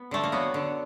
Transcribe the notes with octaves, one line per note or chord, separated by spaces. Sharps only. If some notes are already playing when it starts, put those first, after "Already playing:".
Already playing: B3
D3 A3
A#3
F#3 B3
D3